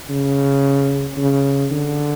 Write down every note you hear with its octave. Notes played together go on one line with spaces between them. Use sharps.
C#3
C#3
D3